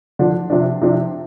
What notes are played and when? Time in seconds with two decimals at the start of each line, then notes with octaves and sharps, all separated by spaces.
0.19 D3 F3 D4
0.50 C3 F3 D4
0.81 C3 F3 D4